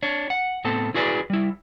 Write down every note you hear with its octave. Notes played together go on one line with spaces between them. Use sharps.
D4 C#5
F#5
A2 B3 C4 A4 A5
E4 F#4 G#4 B4 C#5 D5
G3 E4